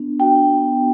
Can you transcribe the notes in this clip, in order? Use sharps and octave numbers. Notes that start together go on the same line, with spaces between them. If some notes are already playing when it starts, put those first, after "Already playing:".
Already playing: B3 D4
F#4 G5
B3